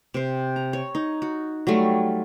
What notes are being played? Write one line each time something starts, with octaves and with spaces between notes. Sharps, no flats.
C3 C5
A#5
C#5
D#4
F#4
F#3 G3 A3 F4